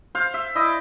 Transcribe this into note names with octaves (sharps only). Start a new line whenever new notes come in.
C5 F5
E5
E4 D5 D#5